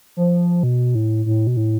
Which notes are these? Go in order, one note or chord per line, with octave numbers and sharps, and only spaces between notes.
F3
B2
A2
A2
B2
A2